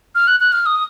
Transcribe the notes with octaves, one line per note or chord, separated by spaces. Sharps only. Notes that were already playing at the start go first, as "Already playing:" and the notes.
F6
F#6
F#6
F6
D#6